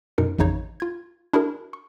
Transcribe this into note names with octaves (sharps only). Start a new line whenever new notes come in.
F#2 B2 D#4 A#4 C#7
A1 F2 C#3 D#4 C#5
F4 G#6
D4 E4 F#4 G#4 A#4
C#6